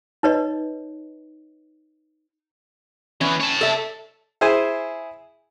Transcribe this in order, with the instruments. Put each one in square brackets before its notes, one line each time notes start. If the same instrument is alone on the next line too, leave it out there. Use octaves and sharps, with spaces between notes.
[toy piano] D#4 B4 C#5 D#5
[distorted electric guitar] E3 B3 [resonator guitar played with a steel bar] C#4
[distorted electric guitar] C#5 A5
[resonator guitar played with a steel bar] A4 E5
[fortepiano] E4 G#4 C5 G#5